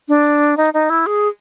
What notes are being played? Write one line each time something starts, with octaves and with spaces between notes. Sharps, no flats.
D4
D#4
D#4
E4
G#4